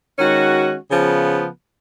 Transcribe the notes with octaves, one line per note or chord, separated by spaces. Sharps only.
D#3 G#3 C#4 F#4
C#3 F3 B3